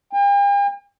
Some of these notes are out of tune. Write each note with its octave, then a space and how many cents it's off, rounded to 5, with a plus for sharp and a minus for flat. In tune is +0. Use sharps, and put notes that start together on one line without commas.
G5 +45